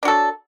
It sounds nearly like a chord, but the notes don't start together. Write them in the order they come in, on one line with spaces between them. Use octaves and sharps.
D4 F#3 A4